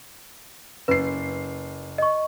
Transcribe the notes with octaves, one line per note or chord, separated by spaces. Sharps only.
F#1 B4 C7
D#5 C#6